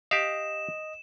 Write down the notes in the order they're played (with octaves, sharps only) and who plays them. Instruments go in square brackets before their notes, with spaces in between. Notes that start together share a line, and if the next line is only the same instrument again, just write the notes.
[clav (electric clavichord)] G4 F5 [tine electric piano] D#5 [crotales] E7